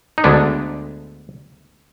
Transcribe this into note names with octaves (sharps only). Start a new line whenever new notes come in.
D#4
D2 D3 G#3 B3 D4